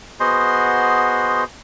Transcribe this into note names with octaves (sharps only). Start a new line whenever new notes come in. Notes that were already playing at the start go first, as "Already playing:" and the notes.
B3 F#4 G#4 C5 D#5 C6